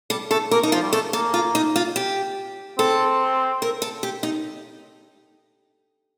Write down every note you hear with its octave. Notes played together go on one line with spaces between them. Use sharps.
G3 A4
A3 A4
A#3 A#4
D#4
F3 F4
G3
A3 A4
A#3 A4
F4
D#4
F4
G4
C4 A4
A#4
A4
G4
D#4